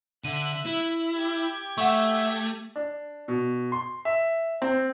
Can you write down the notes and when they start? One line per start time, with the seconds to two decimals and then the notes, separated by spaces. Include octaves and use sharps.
0.24 D3 E5 F#6 D#7
0.66 E4
1.12 G4 G#6
1.78 A3 E5 F#5 C#6
2.76 D4
3.28 B2
3.72 C6
4.05 E5
4.62 C4